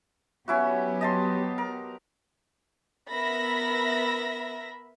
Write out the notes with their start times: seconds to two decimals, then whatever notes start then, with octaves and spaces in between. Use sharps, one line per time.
0.48 F#3 B3 C#4 E4 F#4 G4
1.01 D#5 A5 C6
1.58 A#4
3.12 B3 A#4 E5 B5 A#6